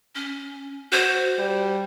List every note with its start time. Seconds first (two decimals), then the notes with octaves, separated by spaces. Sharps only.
0.15 C#4
0.92 F#4 C5
1.38 G3